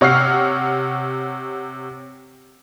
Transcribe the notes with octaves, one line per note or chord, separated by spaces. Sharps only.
C3 C#5 F#5 F6 C7